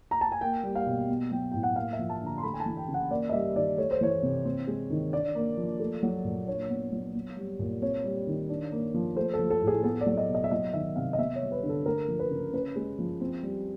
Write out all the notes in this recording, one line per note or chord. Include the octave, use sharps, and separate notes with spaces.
A#5
A5
G#5
A#3 G5
G3
F5
B2
B3
F#3 G5
A2 G5
F#5
A#3 F5
E5
F3
A5
D3 A#5
C6
A3 B5
G#5
A5
E3
G5
C#3
F#5
A#3 D5
D#5
G3 E5
D#3 D5
A3 C#5
C5
E3 C#5
C3
C4
G#3
D#3
D4 D5
A#3
F3
A3
F#3
A#2
D4 C#5
B3
F#3
B3
G3
A#2
C4 C#5
G3
D#3
D4
A#3
F3
A3 C5
A4
F3
A4
A2
G#4
B3 A4
D5
F#3
D#5
B2
D#5
E5
F#3 D#5
D#3 E5
C3 F5
D#5
B3 E5
C#5
G3
B4
D3
A4
A3 A#4
F3
B4
C#3
C#4 B4
G#3
F3
C4
G3